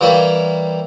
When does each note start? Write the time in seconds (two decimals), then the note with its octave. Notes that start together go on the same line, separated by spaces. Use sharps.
0.01 E3 G3 A#3 E4 C#5